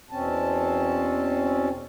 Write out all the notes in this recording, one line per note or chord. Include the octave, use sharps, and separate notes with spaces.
E2 B2 C4 C#4 A5